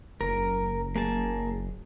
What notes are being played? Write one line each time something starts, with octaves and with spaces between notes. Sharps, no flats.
F#1 A#4
A#3 G#4 A5